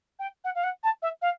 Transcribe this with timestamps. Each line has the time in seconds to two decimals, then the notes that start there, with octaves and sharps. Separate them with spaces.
0.19 G5
0.44 F#5
0.55 F5
0.64 F#5
0.83 A5
1.02 E5
1.22 F5